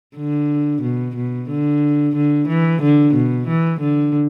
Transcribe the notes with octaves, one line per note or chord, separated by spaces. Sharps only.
D3
B2
B2
D3
D3
E3
D3
B2
E3
D3